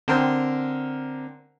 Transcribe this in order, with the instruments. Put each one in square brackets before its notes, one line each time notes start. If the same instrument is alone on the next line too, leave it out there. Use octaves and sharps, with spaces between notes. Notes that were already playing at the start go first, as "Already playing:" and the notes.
[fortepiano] D3 A#4 C5 [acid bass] C4